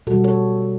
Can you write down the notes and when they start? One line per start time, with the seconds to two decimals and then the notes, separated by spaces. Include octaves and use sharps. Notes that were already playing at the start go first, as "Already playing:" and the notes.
0.07 B2 G3 F#4 A4
0.24 A4 C#5